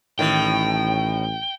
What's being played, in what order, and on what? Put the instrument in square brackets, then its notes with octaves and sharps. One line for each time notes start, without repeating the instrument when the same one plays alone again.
[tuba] A1 [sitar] A2 D#3 [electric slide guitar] G5